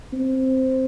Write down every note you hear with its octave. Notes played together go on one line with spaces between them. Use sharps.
C4